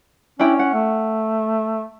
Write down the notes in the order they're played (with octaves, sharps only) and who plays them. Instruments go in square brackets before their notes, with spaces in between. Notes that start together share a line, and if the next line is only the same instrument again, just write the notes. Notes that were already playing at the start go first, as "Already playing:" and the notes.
[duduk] C#4 [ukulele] D4 E4 G5
[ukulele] F#5
[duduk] A3